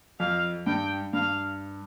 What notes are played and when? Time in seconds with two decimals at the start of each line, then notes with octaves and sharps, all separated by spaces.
0.20 F2 F5
0.66 G2 G5
1.13 G2 F5